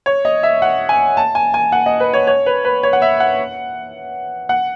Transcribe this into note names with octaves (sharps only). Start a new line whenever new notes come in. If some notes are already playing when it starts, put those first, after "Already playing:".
C#5
D#5
E5
F#5
G#5
A5
G#5
G#5
F#5
D#5
B4
C#5
C#5
B4
B4
C#5
F#5
E5
F#5
F#5